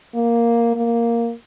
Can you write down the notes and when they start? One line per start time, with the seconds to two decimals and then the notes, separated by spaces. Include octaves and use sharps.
0.15 A#3
0.76 A#3